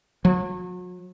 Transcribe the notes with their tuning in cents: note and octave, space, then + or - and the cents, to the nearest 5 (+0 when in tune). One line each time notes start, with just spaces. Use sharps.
F#3 -40